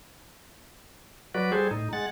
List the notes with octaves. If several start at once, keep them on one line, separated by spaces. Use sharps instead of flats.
F#3 F#4 B4 D5
G3 G#4 A4 C5
A2 D#4
G#3 F#5 A6